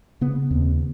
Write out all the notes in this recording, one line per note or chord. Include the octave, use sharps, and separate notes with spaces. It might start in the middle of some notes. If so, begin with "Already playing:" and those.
C#3 B3
D#2 C4